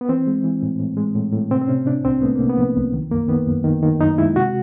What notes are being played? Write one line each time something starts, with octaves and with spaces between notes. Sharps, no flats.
B3
E3 C4
G#3
E3
A2
A2
G#3
A2
A2
C3 C4
C4
C3 C#4
C3 D4
C2 C4
A3 B3
C3 A#3
B3
F3
C2
D#3
F#2 A#3
D#3 B3
F#2
D#3
D#3
F#2 D#4
G#3 E4
C3 F#4